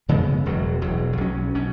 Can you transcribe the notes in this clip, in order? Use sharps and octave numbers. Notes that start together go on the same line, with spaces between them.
F#2 C#3 G#3 B3
E1 E2 B2 F#3
E1 E2 B2 F#3
B1 B2 F#3 C#4
B2 F#3 C#4